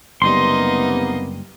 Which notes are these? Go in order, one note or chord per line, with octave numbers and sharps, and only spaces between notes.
F#1 C3 G3 A#3 B3 D#4 D#5 C6